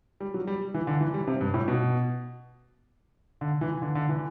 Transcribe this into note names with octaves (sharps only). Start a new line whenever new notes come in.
G3
F#3
G3
E3
D3
E3
G3
C3
G2
A2
B2
D3
E3
D3
D3
E3